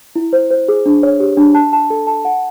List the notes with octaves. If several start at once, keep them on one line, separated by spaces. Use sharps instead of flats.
E4
C5
C5
G#4
D4
C#5
G4
D4
A5
A5
A4
A5
F#5